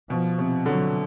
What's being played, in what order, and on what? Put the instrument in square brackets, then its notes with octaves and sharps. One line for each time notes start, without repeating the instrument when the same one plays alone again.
[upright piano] B2 [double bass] F3
[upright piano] C3
[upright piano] D3 [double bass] F#3